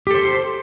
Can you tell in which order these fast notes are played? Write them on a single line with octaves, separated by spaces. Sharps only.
G4 A4 C5